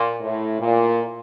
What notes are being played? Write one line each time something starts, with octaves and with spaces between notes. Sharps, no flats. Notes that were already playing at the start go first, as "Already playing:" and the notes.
Already playing: A#2
A2
A#2